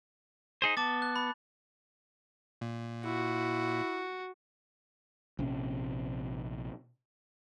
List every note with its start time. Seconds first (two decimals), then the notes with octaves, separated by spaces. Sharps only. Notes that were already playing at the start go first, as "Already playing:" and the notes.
0.62 D#4 G#4 C5
0.77 B3 A5 D6 A6
1.02 F#6
1.16 B5
2.61 A#2
3.05 E4 F#4
5.39 A#1 C3 C#4